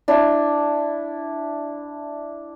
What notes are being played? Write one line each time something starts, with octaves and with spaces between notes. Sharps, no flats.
D4 E4